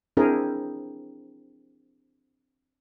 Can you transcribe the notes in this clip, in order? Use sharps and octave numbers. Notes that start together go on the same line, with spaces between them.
C4 D4 E4 G#4 A#4